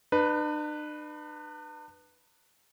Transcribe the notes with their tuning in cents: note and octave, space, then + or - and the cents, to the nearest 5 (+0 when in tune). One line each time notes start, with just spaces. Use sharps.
D4 +45 B4 +0